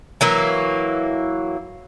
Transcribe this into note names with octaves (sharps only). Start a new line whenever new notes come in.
E3 F#3 A#3